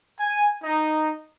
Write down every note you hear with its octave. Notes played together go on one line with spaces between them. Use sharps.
G#5
D#4